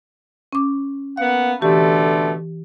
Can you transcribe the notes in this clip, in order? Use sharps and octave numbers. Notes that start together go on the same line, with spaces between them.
C#4 D6
A#3 B3 F5 F#5
B2 D3 E3 A3 G4